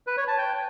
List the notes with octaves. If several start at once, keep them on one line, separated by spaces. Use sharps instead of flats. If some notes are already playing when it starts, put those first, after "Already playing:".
B4
C#5
A5
G5